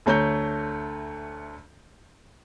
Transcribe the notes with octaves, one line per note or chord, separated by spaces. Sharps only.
D2 A3 C#5 A#5 G6